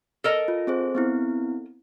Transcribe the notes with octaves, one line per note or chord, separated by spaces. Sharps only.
A4 A#4 D#5
F4
C4 G#4 C5
B3 C4 E4